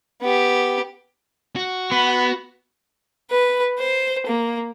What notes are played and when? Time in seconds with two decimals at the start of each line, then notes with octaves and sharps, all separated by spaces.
0.22 B3 G4
1.56 F#4
1.92 B3 B5
3.31 B4
3.79 C5
4.27 A#3